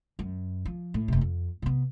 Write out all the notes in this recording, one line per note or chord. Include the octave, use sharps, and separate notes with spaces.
F#2
F3
A2
F1 C3
F2
C3 B3